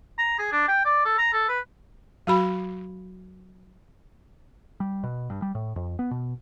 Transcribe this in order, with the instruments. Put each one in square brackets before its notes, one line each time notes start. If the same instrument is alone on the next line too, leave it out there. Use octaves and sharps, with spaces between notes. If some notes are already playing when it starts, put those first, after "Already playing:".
[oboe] A#5
G#4
D4
G5
D5
A4
A#5
A4
B4
[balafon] F#3 F#4 B5
[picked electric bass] G3
B2
G2
G3
A2
F2
B3
B2